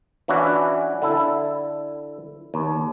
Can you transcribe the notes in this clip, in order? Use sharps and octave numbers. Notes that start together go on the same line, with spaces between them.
E3 C#4 D4 E4 F#4
D3 E4 A4
D#2